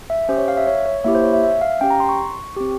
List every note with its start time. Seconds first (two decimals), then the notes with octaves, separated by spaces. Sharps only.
0.10 E5
0.29 C#4 G4 C5
0.38 C#5
0.48 F5
0.57 E5
0.67 C#5
0.86 C#5
1.04 A#3 E4 G4 E5
1.15 C5
1.24 C#5
1.33 E5
1.43 E5
1.61 F5
1.81 C#4 G4 G5
1.90 A#5
2.00 C6
2.09 C#6
2.57 C4 G4